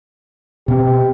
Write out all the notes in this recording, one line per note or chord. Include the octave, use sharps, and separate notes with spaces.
B2 C4 G4